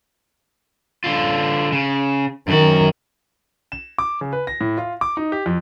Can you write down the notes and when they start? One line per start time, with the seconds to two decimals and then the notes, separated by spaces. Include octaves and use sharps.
1.04 D3 F4
1.72 C#3
2.48 F#2 D#3 F#4
3.72 E7
3.98 D6
4.21 C#3
4.33 B4
4.47 A#6
4.61 A2
4.78 F4
5.01 D6
5.17 D#4
5.32 G4
5.46 F2